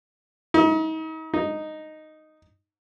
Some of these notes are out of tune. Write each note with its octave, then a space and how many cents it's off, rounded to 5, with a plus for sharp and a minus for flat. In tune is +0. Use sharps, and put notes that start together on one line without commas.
D#4 +40
D#4 -5